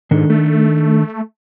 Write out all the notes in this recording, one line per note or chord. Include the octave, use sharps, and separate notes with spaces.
G#2 D#3 D4 A4
A3